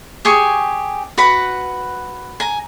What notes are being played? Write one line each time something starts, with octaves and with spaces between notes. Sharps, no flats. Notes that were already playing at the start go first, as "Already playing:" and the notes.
G4 G#4 G#5 C#6
F#4 B4 F#5 B5
G#5 A#5